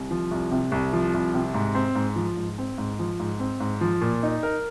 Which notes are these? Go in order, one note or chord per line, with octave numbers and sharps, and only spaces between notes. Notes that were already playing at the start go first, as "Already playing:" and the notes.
Already playing: C2
F3
C2
C3
C2
F3
C2
C3
G#2
C4
G#2
F3
G#2
C4
G#2
F3
G#2
C4
G#2
F3
A#2
D#4
A#4